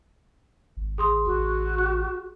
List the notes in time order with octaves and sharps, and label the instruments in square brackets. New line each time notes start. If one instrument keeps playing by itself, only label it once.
[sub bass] G#1
[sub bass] A1 [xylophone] G#4 C6 D#6
[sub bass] A1 [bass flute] F#4
[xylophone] F#6